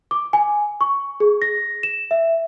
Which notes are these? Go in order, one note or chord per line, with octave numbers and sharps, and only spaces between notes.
D6
G#5
C#6
G#4
A#6
E7
E5